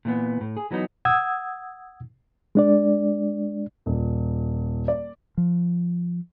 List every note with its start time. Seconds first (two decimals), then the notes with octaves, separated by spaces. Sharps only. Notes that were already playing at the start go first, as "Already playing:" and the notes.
0.05 A#2 E3 B3
0.41 A2
0.57 G#4
0.71 E3 F#3 B3 D#4
1.05 F#5 D#6 E6 G#6
2.55 G#3 D4 D5
3.86 D#1
4.88 D5
5.37 F3